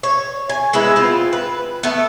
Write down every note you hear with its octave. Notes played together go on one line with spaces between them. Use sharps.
C#5
G#5
G#3 B3 E4 B4
C4 F4
B4
A3 B3